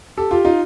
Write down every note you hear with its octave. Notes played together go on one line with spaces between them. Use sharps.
G4 A4
F4 G4
D#4 F4